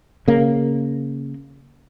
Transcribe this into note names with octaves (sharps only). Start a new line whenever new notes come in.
C#3 A#3